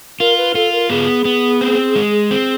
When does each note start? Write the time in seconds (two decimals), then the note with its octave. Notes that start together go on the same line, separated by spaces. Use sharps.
0.20 F4 A#4
0.38 B4
0.55 F4 A4
0.73 A#4
0.90 B3 G#4
1.25 B3
1.61 C4
1.96 G#3
2.31 C4